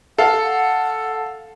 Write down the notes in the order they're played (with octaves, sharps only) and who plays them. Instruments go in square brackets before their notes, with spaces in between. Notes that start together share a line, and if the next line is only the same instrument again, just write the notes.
[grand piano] A4 F5 [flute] F#5